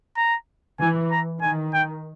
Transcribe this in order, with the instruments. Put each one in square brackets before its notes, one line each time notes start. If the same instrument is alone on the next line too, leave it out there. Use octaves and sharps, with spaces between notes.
[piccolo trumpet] A#5
[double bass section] E3 [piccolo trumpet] G#5
[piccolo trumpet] A#5
[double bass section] D#3 [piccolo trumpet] G#5
[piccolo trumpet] G5